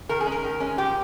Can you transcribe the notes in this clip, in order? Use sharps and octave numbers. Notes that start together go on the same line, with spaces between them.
D#3 A#4
G#4
G#3 C#4
A#4
D#3
G#3 C#4
F3 G4